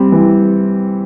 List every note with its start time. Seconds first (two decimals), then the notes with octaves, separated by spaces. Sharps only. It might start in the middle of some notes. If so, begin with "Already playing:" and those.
Already playing: G3 C4
0.12 E3